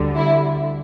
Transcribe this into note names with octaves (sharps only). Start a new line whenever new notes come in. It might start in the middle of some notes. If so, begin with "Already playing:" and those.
Already playing: D2 D3 G3
E4